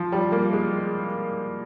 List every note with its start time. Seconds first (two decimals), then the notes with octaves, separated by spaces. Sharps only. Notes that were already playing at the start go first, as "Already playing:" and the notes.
Already playing: F3
0.12 G3
0.32 A#3
0.53 G#3